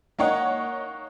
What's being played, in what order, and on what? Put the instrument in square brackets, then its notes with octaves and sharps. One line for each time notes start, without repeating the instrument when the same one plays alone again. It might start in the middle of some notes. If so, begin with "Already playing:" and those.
[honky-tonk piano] A#3 D#4 C#5 D#5 F#5